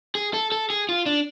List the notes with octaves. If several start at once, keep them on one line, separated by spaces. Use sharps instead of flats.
G#4
A4
A4
G#4
F4
D4